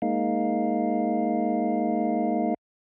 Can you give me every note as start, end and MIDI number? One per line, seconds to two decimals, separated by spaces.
0.02 2.54 56
0.02 2.54 58
0.02 2.54 63
0.02 2.54 77